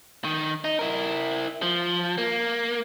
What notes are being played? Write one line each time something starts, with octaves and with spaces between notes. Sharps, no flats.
D#3
D#4
E4 A#4
F3
A#3